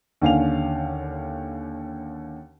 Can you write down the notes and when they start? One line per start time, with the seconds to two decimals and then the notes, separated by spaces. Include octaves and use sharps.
0.21 D#2 D3 C#4 F5 G#5 F7